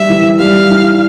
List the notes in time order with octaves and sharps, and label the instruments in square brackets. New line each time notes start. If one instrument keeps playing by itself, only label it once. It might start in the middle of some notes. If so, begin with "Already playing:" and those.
Already playing: [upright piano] G3 [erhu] E5
[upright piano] E3
[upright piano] G3 [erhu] F5
[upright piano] E4